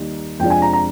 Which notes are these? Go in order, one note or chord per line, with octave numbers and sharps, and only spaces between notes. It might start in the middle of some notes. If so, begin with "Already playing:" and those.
Already playing: D#2 D#3 G3
F2 C3 F3 G#3 D4 G5
G#5
A#5
A#5